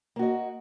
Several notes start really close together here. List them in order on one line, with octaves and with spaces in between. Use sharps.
A#3 F#4 D#5